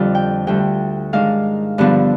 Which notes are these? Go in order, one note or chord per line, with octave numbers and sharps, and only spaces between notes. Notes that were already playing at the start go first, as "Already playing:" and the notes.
Already playing: F2 D3 G3 D4 F4
G5
D2 D3 G3 G5
G#2 D#3 G#3 D4 F5
G2 D3 F3 B3 D4